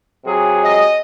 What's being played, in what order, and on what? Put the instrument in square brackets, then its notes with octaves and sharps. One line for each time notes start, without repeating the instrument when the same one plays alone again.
[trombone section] C3 F#3 G#4
[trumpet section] D#5